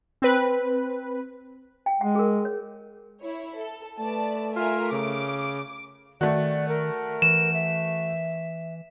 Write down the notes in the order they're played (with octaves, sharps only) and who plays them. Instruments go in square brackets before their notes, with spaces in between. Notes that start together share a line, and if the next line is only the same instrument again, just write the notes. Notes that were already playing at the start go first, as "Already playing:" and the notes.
[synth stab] C4 B4
[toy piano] G5
[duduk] G#3 [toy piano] F#5
[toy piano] G#4 A#4
C#5
[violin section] E4 C#5
A4
[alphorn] A3 [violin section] B4 D5 A5
[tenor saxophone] F4 [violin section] A#4 E5 G#5
[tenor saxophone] C#3 [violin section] D6
[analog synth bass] D#3 [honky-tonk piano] A3 F#4 [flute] D5
[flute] A#4
[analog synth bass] E3 [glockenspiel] E7
[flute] E5